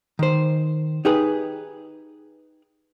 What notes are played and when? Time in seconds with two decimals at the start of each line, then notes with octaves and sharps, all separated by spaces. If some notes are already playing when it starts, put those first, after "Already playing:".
0.19 D#3 C5
1.05 D#4 G4 G#4 B4